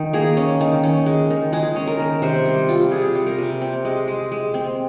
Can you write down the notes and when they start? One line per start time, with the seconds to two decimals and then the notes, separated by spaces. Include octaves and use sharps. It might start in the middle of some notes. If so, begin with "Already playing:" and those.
Already playing: D#3 D#4
0.13 A#3 G#4
0.37 C#4
0.61 D#3
0.83 C#4
1.06 G#3
1.30 D#3
1.53 G#3 G#4
1.76 C#4
1.87 A#4
1.99 D#3
2.22 C3 C5
2.46 G3
2.69 G3 F4
2.91 C3 G#4
3.15 G3
3.27 A#4
3.38 C3
3.61 C4
3.85 G#3
4.08 G#3
4.31 G#3
4.54 C4